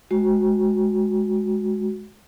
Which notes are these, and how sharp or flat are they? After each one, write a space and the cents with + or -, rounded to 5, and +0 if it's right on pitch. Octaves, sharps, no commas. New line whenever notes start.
G#3 +15 F#4 +0